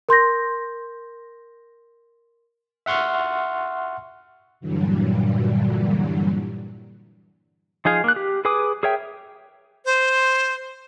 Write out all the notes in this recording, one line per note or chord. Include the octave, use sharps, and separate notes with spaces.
A#4 C6 G6 A#6
E5 F#5 C6 C#6 F6
G2 A#2 D3 E3 F#3 G3
F3 D#4 G#4 F5
A#3 F#6
G4
G#4 B4 G#5 D6 D#6
G#4 A#4 C#5 E5 G5
C5